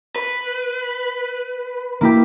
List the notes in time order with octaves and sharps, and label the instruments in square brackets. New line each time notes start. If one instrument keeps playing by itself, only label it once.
[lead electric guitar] B4
[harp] A#3 E4 G4